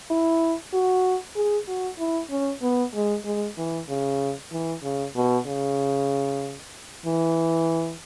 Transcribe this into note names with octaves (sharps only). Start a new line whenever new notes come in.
E4
F#4
G#4
F#4
E4
C#4
B3
G#3
G#3
E3
C#3
E3
C#3
B2
C#3
E3